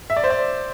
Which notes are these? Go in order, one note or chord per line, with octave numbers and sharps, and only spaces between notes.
E5
D5
C5
D5